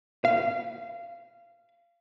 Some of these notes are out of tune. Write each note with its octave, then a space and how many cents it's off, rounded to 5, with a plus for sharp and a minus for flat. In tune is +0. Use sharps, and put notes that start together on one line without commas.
F5 -20